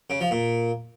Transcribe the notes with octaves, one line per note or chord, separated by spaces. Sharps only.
C#3
F3
A#2